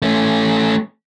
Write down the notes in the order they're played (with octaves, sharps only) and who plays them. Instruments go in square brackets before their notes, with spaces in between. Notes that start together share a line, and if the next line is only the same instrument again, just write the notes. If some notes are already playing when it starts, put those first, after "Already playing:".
[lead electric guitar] A3 C#4